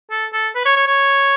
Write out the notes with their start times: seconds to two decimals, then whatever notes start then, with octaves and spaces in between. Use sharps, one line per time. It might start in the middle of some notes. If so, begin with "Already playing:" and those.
0.10 A4
0.33 A4
0.55 B4
0.65 C#5
0.76 C#5
0.87 C#5